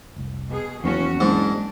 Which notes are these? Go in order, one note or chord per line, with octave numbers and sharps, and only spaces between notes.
F1 C2
B2 G#4
F#1 E2 F3 C#4 F#4
F#1 G#2 D4